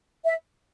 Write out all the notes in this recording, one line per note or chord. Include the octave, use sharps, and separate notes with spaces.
E5